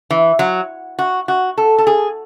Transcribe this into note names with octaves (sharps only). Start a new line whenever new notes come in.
E3
F#3
F#4
F#4
A4
A4
G#4